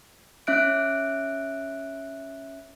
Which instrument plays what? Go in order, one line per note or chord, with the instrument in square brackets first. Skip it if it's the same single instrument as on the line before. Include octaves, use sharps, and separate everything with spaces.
[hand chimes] C#4 E5 F#6 D7